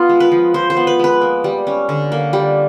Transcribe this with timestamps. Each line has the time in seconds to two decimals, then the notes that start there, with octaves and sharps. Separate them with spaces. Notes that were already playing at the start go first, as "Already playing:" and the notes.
Already playing: B3 F4
0.09 G#3
0.20 B4
0.32 F3
0.54 F3 C5
0.70 C5
0.77 B3
0.87 B4
0.99 G#3 B4
1.22 A#3
1.44 G3
1.67 C#4
1.89 D3
2.12 A#3
2.33 G3